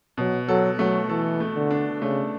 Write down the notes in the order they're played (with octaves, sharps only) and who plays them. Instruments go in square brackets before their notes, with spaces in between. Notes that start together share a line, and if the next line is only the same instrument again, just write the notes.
[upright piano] B2 [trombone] F#3
[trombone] F#3 [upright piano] A4
[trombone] F#3 [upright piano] A3
[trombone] E3 [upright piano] A4
[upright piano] A3
[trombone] D3
[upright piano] D4
[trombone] C#3 [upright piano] A3